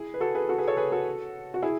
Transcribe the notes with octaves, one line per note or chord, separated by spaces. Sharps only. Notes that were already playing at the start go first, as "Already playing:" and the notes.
Already playing: E4 G#4
B4
F#4 A4
G#4 B4
F#4 A4
G#4 B4
A4 C#5
G#4 B4
F#4 A4
F#4
E4 G#4